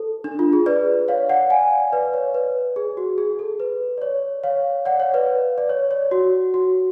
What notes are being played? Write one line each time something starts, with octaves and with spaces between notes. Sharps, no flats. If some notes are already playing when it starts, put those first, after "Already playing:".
Already playing: A4
D4
F4
G#4
B4 D5
C#5 F5
D5 F#5
F5 G#5
B4 D5
C#5
B4
G#4
F#4
G#4
A4
B4
D5
C#5
C#5 F5
D5 F#5
C#5 F5
B4 D5
D5
C#5
C#5
F#4
F#4